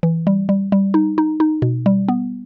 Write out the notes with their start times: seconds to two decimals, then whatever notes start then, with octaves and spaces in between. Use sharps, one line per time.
0.03 E3
0.27 G3
0.49 G3
0.72 G3
0.94 D#4
1.18 D#4
1.40 D#4
1.62 B2
1.86 G3
2.08 B3